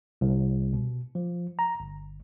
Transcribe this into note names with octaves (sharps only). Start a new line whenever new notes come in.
C2
B2
F3
A#5
G1